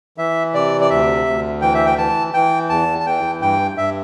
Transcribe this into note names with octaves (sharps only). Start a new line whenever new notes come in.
E3 E5
C3 D5
D5
D2 E5
D2
E3 G5
E5
G5
E3 A5
E3 G5
E2 A5
A5
E3 G5
G2 G5
G2 E5